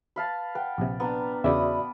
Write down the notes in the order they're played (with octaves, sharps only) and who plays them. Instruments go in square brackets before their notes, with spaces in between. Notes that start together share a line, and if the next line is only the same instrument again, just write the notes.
[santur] B4 F5 A5
[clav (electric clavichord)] B4 [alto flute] F#5 [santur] G5
[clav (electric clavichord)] A#1 C3
[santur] B3 D4 [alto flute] A#5
[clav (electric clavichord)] E2 C#3 [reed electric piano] F#4 D5 E5 [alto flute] B5 [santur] D6 D#6